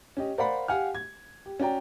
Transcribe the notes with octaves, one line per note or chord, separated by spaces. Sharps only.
C#4 G4 D#5
A#4 C5 D5 F5 F#5 B5
G4 F5 F#5 G#5 F6
G#6
G4
C#4 F#4 D5 G5 A#5